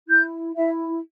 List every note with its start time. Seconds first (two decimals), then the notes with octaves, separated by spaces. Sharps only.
0.08 E4 G6
0.55 E4 E5